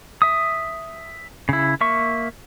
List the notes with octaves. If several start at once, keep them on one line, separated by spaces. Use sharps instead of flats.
E5 D#6
C#3 E4
A#3 E5 C#6